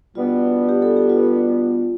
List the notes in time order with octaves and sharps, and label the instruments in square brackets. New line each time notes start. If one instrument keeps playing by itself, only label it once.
[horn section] B2 G3 B3 D4 [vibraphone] F4
[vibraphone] G4
A4
G4
F4